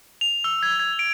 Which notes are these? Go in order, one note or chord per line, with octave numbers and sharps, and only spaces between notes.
F7
E6
G#6
G#6
D7